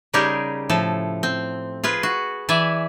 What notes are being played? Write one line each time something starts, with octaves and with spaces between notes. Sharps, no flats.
C#3 G3 D#4 G4 G#4 A#4
A2 F3 A4
C4
F4 G#4 B4
F#4
E3 D5 E5 G#5